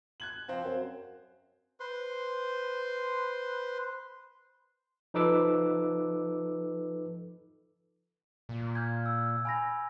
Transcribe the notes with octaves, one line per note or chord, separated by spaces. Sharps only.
F#6 G#6 F#7
F3 C4 C5
F#2
B4 C5 C6
F3 D#4 A4 B4 D6 E6
A#2
F6 G6 G#6
E6
G#5 B5 A#6